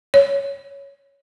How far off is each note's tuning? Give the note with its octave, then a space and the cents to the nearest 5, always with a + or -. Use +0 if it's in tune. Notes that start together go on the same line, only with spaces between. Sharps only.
C#5 +5